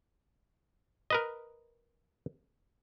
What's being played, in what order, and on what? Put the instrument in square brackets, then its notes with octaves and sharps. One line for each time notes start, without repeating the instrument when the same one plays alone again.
[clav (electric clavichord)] A#4 B4 D#5